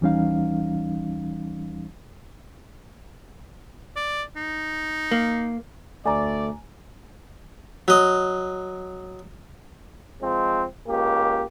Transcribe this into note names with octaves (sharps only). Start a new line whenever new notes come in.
D#2 E3 G3 C#4 D#4 F5
D5
D#4
A#3
D2 A3 D5 G#5 A#5
F#3 D#5
F3 G#3 C4
C#2 A#3 G4